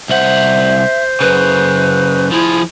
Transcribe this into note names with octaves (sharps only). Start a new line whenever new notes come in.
C2 C5 E5 F#5
F#2 C#3 B4
F3 E4 G#4